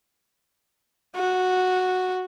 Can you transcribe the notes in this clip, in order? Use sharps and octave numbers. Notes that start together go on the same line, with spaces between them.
F#4